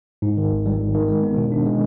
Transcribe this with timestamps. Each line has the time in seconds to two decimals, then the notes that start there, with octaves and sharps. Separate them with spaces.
0.22 G#2
0.37 D#3
0.51 G#1
0.66 G3
0.80 G#2
0.94 D#3
1.08 G#3
1.23 B3
1.37 B2
1.52 D4
1.66 G#3